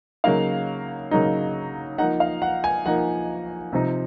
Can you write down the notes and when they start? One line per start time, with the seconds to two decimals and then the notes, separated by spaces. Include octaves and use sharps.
0.24 C#3 F#3 A#3 D#4 F5
1.11 C#3 F#3 A#3 D#4
1.98 F3 A#3 D#4 F#5
2.20 F5
2.42 F#5
2.64 G#5
2.86 F3 A#3 D#4 F#5
3.73 C3 F3 C4 D#4